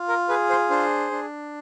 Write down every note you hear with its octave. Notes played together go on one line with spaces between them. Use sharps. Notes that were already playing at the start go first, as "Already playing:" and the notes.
Already playing: F4
A#4
G#4 B4
C5
D4 C5
D4